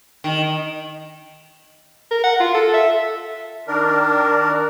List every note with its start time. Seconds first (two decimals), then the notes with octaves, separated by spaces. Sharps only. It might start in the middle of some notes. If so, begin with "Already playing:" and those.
0.24 D#3
2.11 A#4
2.24 F#5
2.40 F4
2.55 A4
2.73 E5
3.68 D#3 D4 A#4